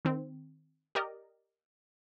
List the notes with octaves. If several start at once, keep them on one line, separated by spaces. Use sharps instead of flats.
D#3 C4
G4 A#4 D5 D#5